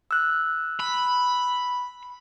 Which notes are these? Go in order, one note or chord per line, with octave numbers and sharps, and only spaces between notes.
E6 F#6
B5